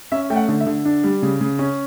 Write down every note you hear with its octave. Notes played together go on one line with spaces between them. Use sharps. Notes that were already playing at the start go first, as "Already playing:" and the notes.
C#4 E5
A3 G5
F#5
D3
E5
D3
D4
G3
C#3
C#3
C#4